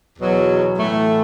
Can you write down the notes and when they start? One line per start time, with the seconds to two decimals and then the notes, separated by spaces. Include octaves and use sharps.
0.19 E2 B2 F#3
0.78 A2 E3 A3